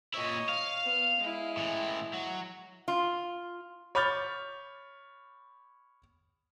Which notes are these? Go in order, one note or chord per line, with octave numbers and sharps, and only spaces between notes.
A#2 E4 C#5 D#5
F5
B3
G#3 E4
A2 E3
F#3
F4
C#5 B5 D6 F6 G6 A6